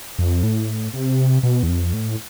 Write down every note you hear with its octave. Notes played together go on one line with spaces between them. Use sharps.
F2
A2
C3
B2
E2
F2
A2